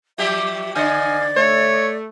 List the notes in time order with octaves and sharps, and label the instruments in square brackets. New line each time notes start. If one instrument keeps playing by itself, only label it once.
[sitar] F3 F#3 G4 [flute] E5
[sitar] D3 C5 [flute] D5 [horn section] D#5 F5 G#5
[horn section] A3 [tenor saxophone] C#5